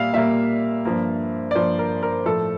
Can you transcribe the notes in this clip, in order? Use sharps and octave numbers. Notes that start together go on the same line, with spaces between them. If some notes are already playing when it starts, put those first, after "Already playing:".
Already playing: A#2 G3 A#3 E5 F5
A#2 G3 A#3 E5
G2 F3 A#3
D5
G2 F3 A#3 C5
A#4
A#4
A2 F3 A3 A4